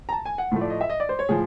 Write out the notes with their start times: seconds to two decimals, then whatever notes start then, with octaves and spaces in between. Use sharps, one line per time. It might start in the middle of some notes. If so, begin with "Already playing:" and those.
0.09 A#5
0.12 A5
0.25 G#5
0.38 F#5
0.52 A2 F3 A3
0.61 D5
0.70 D#5
0.81 E5
0.89 D#5
1.00 D5
1.09 C5
1.19 C#5
1.29 A2 F3 G#4